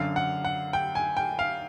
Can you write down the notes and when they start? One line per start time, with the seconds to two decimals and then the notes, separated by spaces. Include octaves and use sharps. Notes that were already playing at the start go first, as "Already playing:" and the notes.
Already playing: F#2 D3 F5
0.16 F#5
0.45 F#5
0.73 G5
0.95 G#5
1.17 G5
1.39 F5